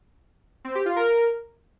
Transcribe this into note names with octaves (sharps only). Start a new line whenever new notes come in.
C4
G4
F4
A#4